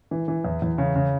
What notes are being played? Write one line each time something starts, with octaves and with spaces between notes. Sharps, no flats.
E3
E3
E2
E2
C#3
C#3